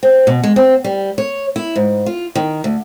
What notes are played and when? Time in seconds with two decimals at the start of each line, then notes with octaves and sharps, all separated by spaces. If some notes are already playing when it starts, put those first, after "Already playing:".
0.03 C4
0.27 B2
0.44 G#3
0.56 C4
0.84 G3
1.18 C#5
1.56 E4
1.75 G#2
2.06 F4
2.35 D#3
2.64 D2